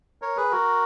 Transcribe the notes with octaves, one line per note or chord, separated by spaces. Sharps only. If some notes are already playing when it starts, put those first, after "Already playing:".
A#4 C#5
G#4 B4
F#4 A#4